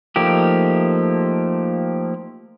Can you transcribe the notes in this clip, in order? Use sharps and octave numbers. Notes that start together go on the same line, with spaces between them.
F3 A3 A#3 D#4 G4